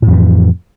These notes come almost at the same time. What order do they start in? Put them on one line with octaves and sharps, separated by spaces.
A2 F2 E3